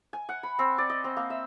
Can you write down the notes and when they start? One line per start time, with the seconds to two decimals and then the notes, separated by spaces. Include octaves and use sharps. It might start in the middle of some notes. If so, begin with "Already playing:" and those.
0.13 G#5
0.29 F#5
0.43 B5
0.59 C4
0.78 D5
0.90 D#5
1.04 C4
1.17 A#3
1.30 E5